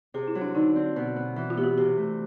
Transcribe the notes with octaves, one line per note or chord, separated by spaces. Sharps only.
C3 G#4
E4
F#3
D4
D3 D#4
C4
B2
B3
E3
F4
B3 G4
F#4
C3 G4
A3